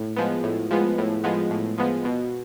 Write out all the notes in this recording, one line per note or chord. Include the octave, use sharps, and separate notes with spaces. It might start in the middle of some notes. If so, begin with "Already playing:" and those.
Already playing: A2
F3 G#3 B3
A2
F3 G#3 B3
A2
F3 G#3 B3
A2
F3 G#3 B3
B2